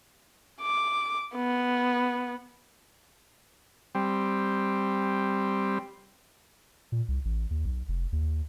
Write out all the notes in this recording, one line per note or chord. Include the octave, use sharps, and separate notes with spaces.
D6
B3
G3 C4
A#2
C2
A1
D#2
B1
F1
D#2